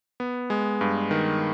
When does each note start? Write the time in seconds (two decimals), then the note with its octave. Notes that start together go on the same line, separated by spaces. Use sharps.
0.20 B3
0.50 G#3
0.81 G2
1.11 D#3